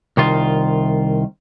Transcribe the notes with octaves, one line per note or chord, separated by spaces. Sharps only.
C2 D#3 F4